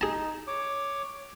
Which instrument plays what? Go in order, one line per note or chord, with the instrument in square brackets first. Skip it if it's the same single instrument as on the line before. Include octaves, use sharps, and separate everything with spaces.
[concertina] D#4 [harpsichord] G#4 A5
[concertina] C#5 D6